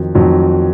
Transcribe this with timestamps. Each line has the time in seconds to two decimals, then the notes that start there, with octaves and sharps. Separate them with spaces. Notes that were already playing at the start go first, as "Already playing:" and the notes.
Already playing: F2 D#3 F#3
0.15 F2 D#3 F#3